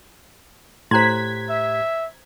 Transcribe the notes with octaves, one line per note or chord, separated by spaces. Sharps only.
A2 G4 C5 A#5 C6 F#6 G#6 B6
E5